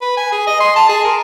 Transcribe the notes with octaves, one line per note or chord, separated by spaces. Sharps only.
B4
G#5
G#4
D#5
C6
A5
G#4
A#4